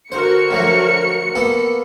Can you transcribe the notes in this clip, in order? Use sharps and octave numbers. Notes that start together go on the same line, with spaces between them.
D3 F#4 A#4 C5 C#7
F3 F#3 A3
A#3 B3 A4